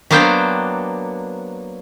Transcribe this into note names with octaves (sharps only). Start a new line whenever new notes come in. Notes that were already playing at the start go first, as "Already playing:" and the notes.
F#3 A#3 B3 D4 C5 G5